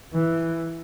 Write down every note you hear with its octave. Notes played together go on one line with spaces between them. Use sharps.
E3